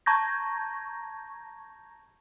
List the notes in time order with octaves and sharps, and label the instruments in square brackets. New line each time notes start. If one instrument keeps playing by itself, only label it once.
[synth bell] A5 A#5 C#6 G6 G#6 A#6